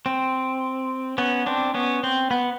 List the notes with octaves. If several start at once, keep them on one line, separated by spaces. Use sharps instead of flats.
C4
B3 C#4
C4 D4
B3 C#4
C4
B3